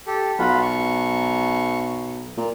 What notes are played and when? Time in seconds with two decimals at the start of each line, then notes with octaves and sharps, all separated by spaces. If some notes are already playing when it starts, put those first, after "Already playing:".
0.07 G4 A4
0.39 B1 F4 F#4 B5
0.62 C#6
2.37 A#2